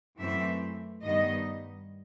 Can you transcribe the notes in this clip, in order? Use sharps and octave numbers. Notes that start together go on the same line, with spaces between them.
F#2 E3 A3 C4 E5
G2 D#3 G3 B3 D#5